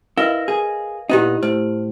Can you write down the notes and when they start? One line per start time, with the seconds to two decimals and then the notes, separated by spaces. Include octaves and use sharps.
0.18 E4 A#4 B4 D#5 F5
0.48 G#4
1.10 A#2 B3 D#4 E4 G4
1.43 A2 C5